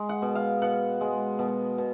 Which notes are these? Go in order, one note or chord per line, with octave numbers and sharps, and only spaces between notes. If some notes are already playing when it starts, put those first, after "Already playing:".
Already playing: G#3
F#5
B2
F5
B2 F#5
G#3
B2
B2